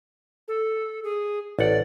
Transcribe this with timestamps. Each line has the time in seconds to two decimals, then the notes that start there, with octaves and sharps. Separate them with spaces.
0.48 A4
1.04 G#4
1.59 A1 D5 F#5